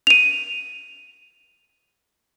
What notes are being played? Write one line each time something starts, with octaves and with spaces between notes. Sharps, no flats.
D#7 F7